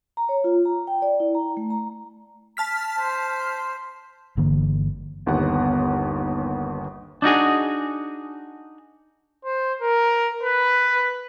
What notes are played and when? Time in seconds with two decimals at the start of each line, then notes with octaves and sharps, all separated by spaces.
0.17 A#5
0.29 C#5
0.44 F4
0.65 A#5
0.87 G5
1.02 D5
1.20 E4
1.35 A#5
1.57 A3
1.70 A#5
2.57 A5 F6 B6
2.99 C5
4.37 G1 D3 E3 A#3
5.26 G1 D#2 B3 F#5
7.22 D4 D#4 F#4 G#4
9.45 C5
9.82 A#4
10.43 B4